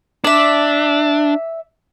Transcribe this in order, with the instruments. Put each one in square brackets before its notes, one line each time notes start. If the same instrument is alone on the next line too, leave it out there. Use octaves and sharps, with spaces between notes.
[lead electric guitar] D4 [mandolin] D5 E5